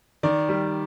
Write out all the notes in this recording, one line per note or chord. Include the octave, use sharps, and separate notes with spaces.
D#3 D5
G3